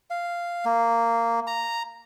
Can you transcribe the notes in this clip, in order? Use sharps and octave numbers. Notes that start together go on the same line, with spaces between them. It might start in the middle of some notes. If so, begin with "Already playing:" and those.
F5
A#3
A#5